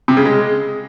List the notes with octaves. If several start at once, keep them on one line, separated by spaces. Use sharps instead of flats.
C3
C#3
G#3